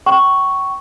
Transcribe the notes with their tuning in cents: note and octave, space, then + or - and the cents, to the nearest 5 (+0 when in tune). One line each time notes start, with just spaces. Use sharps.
G5 -40 C#6 +0